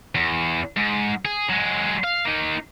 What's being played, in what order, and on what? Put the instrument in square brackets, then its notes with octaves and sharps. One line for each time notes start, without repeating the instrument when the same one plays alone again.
[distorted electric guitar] E2
G#2
G#4
F#3 G#3
F5
A#3 D#4